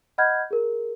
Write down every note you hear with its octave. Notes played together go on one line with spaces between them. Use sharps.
D#5 F#5 B5 F6 G6 G#6
G#4 A#4